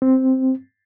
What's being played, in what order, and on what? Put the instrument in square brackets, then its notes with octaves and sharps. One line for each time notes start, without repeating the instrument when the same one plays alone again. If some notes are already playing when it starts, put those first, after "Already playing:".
[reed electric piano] C4